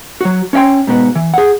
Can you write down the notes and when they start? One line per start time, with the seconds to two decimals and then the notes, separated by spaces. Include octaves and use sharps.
0.21 F#3 F#4
0.53 C#4 C#5 D#5 G5 C6
0.87 G#2 B2 B3
1.15 E3
1.34 G#4 F#5